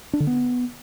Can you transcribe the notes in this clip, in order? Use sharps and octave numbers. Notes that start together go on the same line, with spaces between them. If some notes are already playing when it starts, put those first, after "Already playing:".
D4
D3
B3